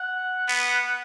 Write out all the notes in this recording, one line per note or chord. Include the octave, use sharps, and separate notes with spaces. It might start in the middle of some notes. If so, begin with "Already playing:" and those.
Already playing: F#5
B3